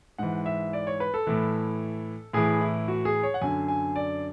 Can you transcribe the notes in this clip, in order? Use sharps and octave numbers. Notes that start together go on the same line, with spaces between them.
G#2 E3 F#5
E5
D5
C#5
B4
A4
A2 E3
A2 E3 G#4
E4
F#4
G#4
C#5
F#5
F#2 D3 G#5
G#5
D5